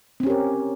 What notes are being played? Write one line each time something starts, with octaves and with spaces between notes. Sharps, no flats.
C4 C#4 G4 A#4